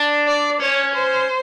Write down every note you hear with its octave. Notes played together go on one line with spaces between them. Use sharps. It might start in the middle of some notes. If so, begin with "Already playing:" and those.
Already playing: D4
D5
C#4 C#5
C5